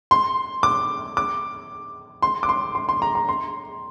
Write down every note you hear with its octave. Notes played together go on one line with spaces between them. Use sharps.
C6
D6
D6
C6
D6
C6
C6
C6
A#5
A#5
C6